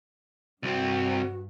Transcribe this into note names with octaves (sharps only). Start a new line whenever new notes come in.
C2 G2 C4 F#4